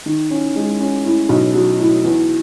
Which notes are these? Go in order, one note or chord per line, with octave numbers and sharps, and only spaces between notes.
D#3
C#4
G#3
C#4
A2
B1
F#3
A2
E2